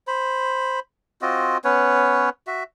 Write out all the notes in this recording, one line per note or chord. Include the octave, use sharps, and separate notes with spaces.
C5 B5
C4 F4 F#4 D#5
B3 C#4 B4 C#5
F#4 E5